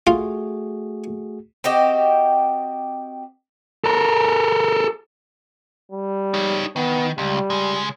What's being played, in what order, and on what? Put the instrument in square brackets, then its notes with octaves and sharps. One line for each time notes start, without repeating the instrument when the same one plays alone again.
[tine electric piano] A3 F#4 G#4 [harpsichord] F4
[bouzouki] C4 F#4 G4 D#5
[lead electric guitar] A4 A#4
[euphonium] G3
[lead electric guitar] D#4 C#5
[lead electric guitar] D#3 [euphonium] B3
[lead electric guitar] C#2 [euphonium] G3
[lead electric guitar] C#3 G#3